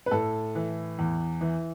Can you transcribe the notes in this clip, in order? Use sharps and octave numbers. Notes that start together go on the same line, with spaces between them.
B4
A2 A4
E3
E2
E3